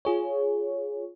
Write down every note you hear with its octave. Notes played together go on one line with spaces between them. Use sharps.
F4 G#4 C#5